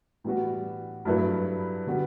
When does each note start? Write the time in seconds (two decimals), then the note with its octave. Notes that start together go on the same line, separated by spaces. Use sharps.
0.24 A2 E3 G3 B3 F#4
1.05 G2 F#3 A3 E4 B4
1.87 D3 G3 B3 F#4